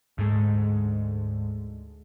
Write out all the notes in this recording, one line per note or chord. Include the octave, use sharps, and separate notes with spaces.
D2 G#2 D3 G#3